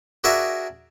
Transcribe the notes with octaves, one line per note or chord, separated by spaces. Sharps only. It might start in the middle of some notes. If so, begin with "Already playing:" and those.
D4 F#4 G#4 A#4 D5 E5